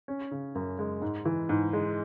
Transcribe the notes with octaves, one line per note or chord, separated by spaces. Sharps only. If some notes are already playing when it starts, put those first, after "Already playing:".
C#4
C#3
F#2
G#3
G#2
E3
G#2
G#3